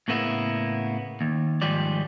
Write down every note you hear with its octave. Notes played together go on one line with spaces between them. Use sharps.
A2 C#3 A#3 B3 E4
D#2
G#2 D#3 F3 G3 D5